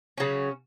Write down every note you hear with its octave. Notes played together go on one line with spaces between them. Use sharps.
C#3 F#3 C#4